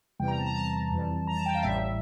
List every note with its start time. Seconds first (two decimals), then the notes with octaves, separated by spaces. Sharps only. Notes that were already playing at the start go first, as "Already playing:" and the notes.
0.19 E2 C3 E3 G3 G5
0.28 A#5
0.38 A5
0.47 A#5
0.56 A5
0.91 F2 E3 G3
1.27 A#5
1.36 A5
1.46 G5
1.55 F5
1.63 A1 A2 G3 E5